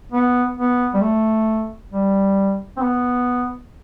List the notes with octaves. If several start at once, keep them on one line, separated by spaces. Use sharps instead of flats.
B3
B3
G3
A3
G3
C4
B3